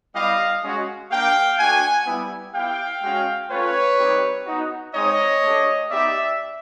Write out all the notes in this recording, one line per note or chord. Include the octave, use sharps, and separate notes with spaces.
G3 B3 E4 G4 D#5 F5
G#3 C#4 F#4
A#3 D4 G4 F5 G5
A3 D4 F#4 F#5 G#5
G3 B3 E4
B3 E4 G4 F5 G5
G#3 C#4 F#4
A3 C#4 F4 B4 C#5
G3 C4 D#4 G4
B3 D#4 F#4
G#3 C4 D#4 C#5 D#5
A3 D4 G4
B3 D#4 G4 D5 E5